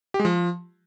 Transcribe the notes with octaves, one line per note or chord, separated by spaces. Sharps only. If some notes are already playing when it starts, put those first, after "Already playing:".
G4
G#3
F3